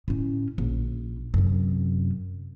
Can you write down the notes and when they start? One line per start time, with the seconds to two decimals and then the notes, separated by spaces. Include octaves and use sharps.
0.08 A2 C#4
0.58 A#1
1.34 F#2 C3